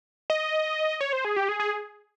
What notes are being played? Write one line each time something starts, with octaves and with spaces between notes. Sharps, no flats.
D#5
C#5
C5
G#4
G4
G#4
G#4